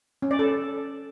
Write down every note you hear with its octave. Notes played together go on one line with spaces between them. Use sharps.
C#4
D5
A4